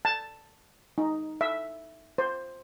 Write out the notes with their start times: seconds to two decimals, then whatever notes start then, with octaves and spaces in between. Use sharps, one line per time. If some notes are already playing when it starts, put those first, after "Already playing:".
0.05 A5
0.98 D#4
1.41 E5
2.18 C5